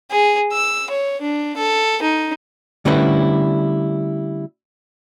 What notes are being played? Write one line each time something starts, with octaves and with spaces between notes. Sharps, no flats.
G#4
E6
C#5
D4
A4
D#4
D3 G3 A3 C#4 E4 B4